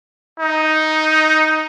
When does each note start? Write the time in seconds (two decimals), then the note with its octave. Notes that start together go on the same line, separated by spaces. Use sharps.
0.40 D#4